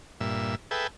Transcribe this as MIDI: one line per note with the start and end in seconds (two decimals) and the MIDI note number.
0.21 0.55 43
0.21 0.55 46
0.21 0.55 76
0.71 0.87 68
0.71 0.87 69
0.71 0.87 71
0.71 0.87 76
0.71 0.87 79